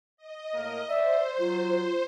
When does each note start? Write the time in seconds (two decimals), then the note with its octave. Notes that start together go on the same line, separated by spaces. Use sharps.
0.17 D#5
0.54 A2 A#3 A#4
0.89 C5 D5 E5
1.39 F#3 F4